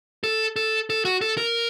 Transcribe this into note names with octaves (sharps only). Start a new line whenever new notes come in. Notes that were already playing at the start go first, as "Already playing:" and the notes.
A4
A4
A4
F#4
A4
A#4